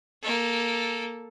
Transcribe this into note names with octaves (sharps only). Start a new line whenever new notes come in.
A#3 A4